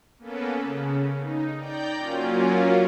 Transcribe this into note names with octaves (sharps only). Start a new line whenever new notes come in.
A#3 B3 C#4 A4 B4
C#3
D#4
D5 G5 A#5 G6
F#3 A#3 C#4 F4